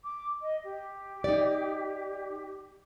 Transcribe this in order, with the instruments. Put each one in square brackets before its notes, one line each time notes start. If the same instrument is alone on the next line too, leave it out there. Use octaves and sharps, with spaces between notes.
[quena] D6
D#5
G4
[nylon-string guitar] D#4 D5